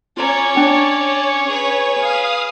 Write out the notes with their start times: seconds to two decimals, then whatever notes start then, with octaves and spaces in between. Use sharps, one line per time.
0.17 C#4 F4 C#5 D5 A#5
0.55 D4 G5 G#5
1.47 G#4 B4
1.96 F5 G#5 D#6